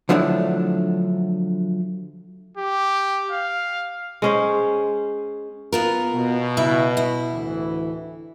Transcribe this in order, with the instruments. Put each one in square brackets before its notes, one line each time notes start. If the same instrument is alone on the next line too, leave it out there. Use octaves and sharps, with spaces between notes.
[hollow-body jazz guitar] D3 F3 F#3 A3 D4 E4
[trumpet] G4
F5
[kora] G#3 C#4 C5
[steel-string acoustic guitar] B3 F4 A#4
[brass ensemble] B2
[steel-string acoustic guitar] C#3 E4 E5
E4
[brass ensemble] D2 A2 E3